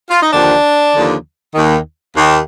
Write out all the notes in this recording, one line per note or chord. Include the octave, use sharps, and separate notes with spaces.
F4
D#4
D#2 D3 F3 D4
D#2 D3 F3
D#2 D#3
D#2 D#3